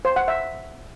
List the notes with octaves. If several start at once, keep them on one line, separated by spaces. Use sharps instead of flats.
C5
F#5
E5